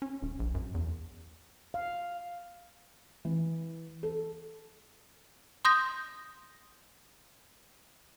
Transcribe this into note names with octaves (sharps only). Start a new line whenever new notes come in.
C#4
D#1
A#1
F#2
E2
F5
E3
A4
C6 D#6 G6 A#6